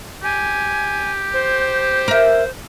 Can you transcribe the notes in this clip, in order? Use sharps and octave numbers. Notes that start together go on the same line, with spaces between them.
G4 G#5
C5
A#4 E5